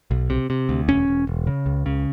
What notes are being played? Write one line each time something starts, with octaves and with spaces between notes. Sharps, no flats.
B1
C3
C3
D2
E1 C#4
E1
E1
C#3
C#2
C#3